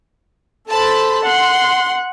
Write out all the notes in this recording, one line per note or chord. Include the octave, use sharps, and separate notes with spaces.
A4 C5 A5 B5
F#5 C6